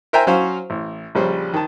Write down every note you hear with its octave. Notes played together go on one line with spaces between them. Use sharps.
A#4 C5 E5 G5 G#5 A#5
F#3 C#4 F#4 C5 F5
A1
A#1 C#3 G3 C5
D#3 A5